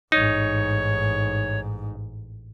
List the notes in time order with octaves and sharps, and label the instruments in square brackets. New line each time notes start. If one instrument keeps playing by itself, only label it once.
[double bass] A1 G#2 [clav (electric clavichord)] D#4 [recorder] C#5